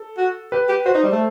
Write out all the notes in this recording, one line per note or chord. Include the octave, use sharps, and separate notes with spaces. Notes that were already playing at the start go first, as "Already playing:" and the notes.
Already playing: A4
F#4
G4 B4
G4
F#4 C5
D#4
G3
A3